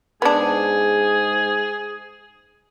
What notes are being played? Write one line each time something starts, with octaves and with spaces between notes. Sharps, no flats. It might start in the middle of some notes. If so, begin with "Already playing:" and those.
G#2 B3 D4 G#4